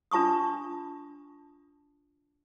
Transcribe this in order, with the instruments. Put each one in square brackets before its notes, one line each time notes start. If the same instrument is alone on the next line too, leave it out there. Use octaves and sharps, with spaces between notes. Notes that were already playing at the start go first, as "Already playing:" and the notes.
[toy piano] D4 F4 A5 C#6 D#6